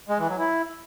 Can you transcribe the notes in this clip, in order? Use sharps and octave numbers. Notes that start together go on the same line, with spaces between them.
G#3
E3
F#3
E4